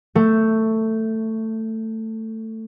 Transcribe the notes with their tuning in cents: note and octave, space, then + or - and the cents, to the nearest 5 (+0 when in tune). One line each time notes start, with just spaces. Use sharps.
A3 +15 E5 +0